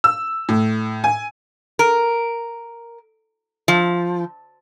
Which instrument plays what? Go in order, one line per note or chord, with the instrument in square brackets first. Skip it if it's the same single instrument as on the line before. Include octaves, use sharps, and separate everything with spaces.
[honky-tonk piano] E6
A2
G#5
[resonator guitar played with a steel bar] A#4
F3